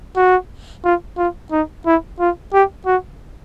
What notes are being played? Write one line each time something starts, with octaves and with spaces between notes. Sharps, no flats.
F#4
F4
F4
D#4
E4
F4
G4
F#4